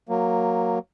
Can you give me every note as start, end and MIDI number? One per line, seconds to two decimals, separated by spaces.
0.09 0.79 54
0.09 0.79 58